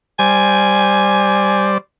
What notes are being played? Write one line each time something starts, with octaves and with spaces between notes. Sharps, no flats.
G3 C5 D5 G#5